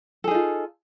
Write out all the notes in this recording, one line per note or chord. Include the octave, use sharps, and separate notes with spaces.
D#4 F4 G#4 A4